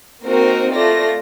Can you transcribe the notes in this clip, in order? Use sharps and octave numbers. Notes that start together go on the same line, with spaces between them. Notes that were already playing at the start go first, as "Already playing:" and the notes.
A#3 C4 D#4 F#4 A#4
A3 F4 D5 A#6